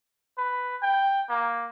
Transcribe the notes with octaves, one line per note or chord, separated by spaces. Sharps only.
B4
G5
A#3